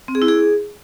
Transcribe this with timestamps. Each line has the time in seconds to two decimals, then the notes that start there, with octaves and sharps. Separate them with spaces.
0.08 C4
0.15 G#4
0.22 E4
0.28 G#4